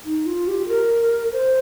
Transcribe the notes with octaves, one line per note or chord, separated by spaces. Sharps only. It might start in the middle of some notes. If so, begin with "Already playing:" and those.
D#4
F4
G4
A#4
C5